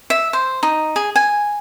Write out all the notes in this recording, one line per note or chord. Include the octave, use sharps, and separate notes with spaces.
E5
C5
D#4
G#4
G#5